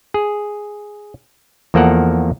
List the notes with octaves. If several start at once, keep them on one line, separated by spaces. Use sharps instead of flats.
G#4
E2 F3 A#3 A4 A#4 F#5